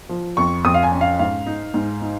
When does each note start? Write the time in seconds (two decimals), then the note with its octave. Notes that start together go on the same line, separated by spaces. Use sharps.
0.09 F3
0.37 F2 C#6
0.64 F2 D#6
0.74 F5
0.83 G#5
0.92 C#4
1.01 F5
1.19 G#2 F5
1.47 D#4
1.74 G#2
2.02 D#4